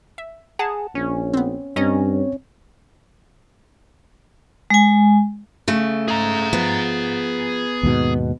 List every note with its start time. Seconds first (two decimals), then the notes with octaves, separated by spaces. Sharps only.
0.18 E5
0.59 G#4 F#5 A5 A#5
0.95 A#1 C#4
1.34 B3 C4
1.76 G2 C4 C#4 C#5 D#5 A#5
4.70 G#3 G#5
5.68 C#3 A3
6.08 G#4 A#5
6.53 F3 B3
7.83 D#2 G#2 B2